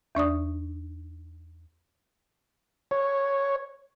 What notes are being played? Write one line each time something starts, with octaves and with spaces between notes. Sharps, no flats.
E2 D4 D5 D#6
C#5